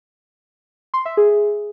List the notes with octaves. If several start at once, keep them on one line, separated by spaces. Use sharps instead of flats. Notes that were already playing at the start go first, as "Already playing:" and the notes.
C6
E5
G#4